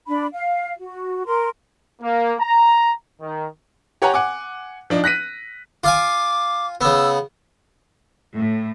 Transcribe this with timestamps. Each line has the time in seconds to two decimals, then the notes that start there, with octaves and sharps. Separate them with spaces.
0.08 D4 B5
0.33 F5
0.77 F#4
1.25 A#4 C6
2.01 A#3
2.40 A#5
3.22 D#3
4.02 G4 C#5 F#5 G#5 A#5
4.14 F#5 G#5 D6
4.90 F3 D4 D#4
5.04 F#6 A#6 B6 D#7
5.84 F4 F5 G#5 D6
6.81 C#3 B3 E6
8.35 A2